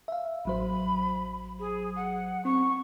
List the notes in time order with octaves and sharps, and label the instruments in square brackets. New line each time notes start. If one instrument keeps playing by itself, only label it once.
[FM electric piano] E5 F5
[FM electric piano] A1 F#3 C5 [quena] B5
[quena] G#4
F#5
[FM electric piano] C4 [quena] C#6